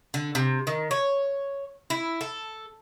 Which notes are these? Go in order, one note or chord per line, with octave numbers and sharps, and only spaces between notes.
D3
C3
D#3
C#5
E4
A4